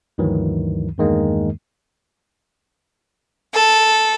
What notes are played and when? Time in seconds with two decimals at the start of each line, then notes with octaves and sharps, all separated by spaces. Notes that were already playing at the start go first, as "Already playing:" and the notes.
0.18 D2 G2 D#3 E3 F#3
0.98 E2 G2 D#3 G#3 A#3
3.53 A4